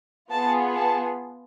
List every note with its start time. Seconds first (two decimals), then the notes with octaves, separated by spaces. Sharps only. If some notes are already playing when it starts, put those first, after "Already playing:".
0.30 B3 F4 G#4 A5
0.76 A5